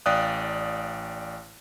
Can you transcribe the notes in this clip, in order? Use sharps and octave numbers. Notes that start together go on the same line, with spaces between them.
A1 D5 F5 G5 D#6 F#6